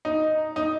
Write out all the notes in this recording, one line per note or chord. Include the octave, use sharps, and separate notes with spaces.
D#4
D#4